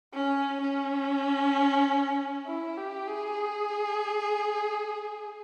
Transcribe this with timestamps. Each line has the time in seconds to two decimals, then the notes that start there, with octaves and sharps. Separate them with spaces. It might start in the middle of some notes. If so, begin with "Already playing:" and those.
0.14 C#4
0.61 C#4
2.46 E4
2.77 G4
3.08 G#4